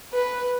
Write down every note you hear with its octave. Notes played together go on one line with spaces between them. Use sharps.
B4